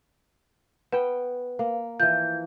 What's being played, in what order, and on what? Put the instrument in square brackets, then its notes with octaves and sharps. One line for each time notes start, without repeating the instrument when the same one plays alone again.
[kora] B3 G5 [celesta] B4
[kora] A#3
[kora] E3 F3 [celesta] G6